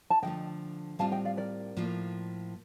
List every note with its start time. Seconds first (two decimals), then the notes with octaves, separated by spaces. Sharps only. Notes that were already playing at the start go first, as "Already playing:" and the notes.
0.10 A5
0.22 D3 F3 A3 D#5 G5
0.99 A2 G3 C4 F4 F5 A5
1.11 D#5 G5
1.25 D5 F5
1.37 A#4 D5
1.77 A2 F3 A#3 F4